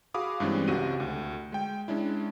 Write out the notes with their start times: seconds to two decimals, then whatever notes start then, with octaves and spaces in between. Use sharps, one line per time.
0.14 F#4 G#4 F5 B5 D6 D#6
0.40 G2 E3 G#3 C4 C#4
0.68 C#2 C3 F#4 D#7
1.00 D2
1.52 G#3 G5
1.88 G#3 C#4 D4 E4